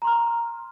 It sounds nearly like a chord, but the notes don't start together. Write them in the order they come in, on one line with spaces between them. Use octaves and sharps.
A#5 C6 F6